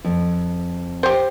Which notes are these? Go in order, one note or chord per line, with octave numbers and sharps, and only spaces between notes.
F2
G4 C5